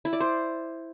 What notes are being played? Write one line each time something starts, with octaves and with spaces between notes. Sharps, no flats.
E4
D5
C5